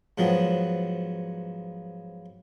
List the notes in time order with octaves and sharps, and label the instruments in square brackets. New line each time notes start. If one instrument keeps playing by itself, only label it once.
[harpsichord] G#2 F3 F#3 B3